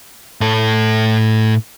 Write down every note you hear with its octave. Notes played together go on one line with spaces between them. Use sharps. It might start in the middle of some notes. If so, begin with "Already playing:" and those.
A2 A4